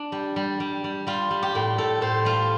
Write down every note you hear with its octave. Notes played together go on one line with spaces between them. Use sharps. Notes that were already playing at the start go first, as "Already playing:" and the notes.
Already playing: D4
G3
G3
G3
G3
G3 F4
G3
G4
A2
A2 A4
A2 C5
G3 F4